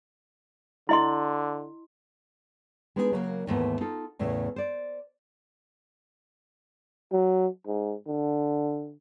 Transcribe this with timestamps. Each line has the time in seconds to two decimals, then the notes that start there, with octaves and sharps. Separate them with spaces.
0.89 D3 E4 D#5 C6
2.96 G#3 B3 D4 D#4 F#4 G#4
3.12 C#3 F#3 G#3 A#3
3.47 D#2 G#2 E3 A3 B3
3.81 D#4 F4 A4
4.19 E2 A2 C#3 A3
4.56 C5 D5
7.12 F#3
7.67 G#2
8.07 D3